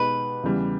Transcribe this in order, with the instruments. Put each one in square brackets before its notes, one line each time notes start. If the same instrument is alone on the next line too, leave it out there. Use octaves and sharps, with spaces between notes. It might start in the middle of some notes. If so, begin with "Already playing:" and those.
Already playing: [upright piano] B2 G#3 D#4 G4 [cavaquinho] B4
[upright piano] E2 C#3 E3 G3